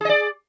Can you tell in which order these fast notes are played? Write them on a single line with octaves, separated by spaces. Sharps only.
G#4 D#5 D5